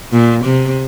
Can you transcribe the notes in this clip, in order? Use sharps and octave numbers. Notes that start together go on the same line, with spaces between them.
A#2
C3